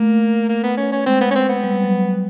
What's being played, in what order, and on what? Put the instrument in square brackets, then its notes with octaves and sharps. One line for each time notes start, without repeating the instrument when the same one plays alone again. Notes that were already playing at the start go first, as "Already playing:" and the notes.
Already playing: [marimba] A3 [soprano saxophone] A#3
[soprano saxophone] A#3
B3
C#4
C#4
[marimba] G#3 [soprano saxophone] C4
[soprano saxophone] B3
C#4
C4
B3
[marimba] G3
F#3